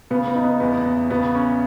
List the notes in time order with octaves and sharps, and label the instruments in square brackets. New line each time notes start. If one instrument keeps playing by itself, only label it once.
[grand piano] C#3 [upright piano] B3
[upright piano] B3
[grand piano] D#4
[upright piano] B3
[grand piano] E2 [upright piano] B3
[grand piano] E2
[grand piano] C#3 [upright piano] B3
[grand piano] C#4